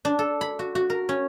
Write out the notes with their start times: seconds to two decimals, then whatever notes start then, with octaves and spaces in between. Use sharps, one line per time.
0.05 D4
0.19 A4
0.41 B5
0.59 F#4
0.75 F#4
0.90 A#4
1.09 C#4